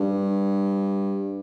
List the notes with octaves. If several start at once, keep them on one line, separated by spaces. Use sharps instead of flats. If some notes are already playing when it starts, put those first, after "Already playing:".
Already playing: G2